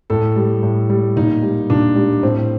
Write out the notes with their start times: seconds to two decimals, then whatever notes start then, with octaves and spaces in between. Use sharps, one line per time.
0.10 A2 A4
0.36 G3
0.63 A2
0.89 G3
1.16 A#2 D#4
1.42 G3
1.70 A#2 D4
1.96 G3
2.23 A2 C4